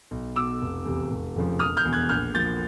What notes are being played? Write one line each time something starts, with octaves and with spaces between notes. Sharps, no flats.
B1
B2 D6 E6
F1
E2 C3
F1
F2 C#3 F3
E1 D#6 F6
F6 G6
E2 B2
F#6 G#6
A#1 F6 G6
A#2 F3 G6 A6